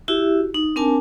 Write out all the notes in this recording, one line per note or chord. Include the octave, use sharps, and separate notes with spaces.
E4 F#4 G4 E5
D#4
C4 D4 A#4 G#5 A5